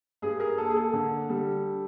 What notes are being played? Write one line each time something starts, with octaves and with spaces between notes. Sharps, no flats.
G2 G#4
G#4 A#4
A#3 A4
G#4
A4
D3
G3